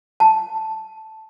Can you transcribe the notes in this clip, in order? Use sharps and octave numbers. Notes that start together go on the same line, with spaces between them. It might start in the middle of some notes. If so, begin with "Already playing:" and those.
A5